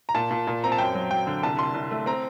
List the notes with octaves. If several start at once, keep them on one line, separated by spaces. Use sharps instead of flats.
A#5
A#2 A5
A#2
A#2
C4 A#5
A5
F#2 G5
F#3
F#3 G5
D3
C2 A5
C2 C6
C2
A3
C4 A#5